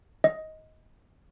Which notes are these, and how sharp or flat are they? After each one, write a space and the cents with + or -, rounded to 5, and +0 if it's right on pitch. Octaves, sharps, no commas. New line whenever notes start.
D#5 +15